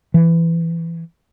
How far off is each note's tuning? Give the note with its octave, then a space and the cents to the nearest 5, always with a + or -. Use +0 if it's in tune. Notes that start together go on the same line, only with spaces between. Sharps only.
E3 +15